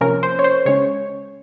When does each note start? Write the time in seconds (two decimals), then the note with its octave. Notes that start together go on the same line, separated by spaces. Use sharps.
0.01 C3 F3 A#3 C#4 A#4
0.23 C5
0.39 C#5
0.44 C5
0.66 C#3 G#3 C#4 C#5